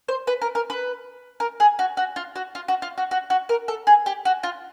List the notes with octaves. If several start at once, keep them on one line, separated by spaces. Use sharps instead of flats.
C5
B4
A#4
A#4
B4
A#4
G#4
F#4
F#4
F4
F#4
F4
F#4
F4
F#4
F#4
F#4
A#4
A4
G#4
G4
F#4
F4